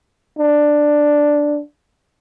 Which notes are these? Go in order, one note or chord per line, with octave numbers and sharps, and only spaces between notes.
D4